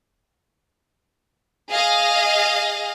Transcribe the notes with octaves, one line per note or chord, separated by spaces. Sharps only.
G#4 D#5 F5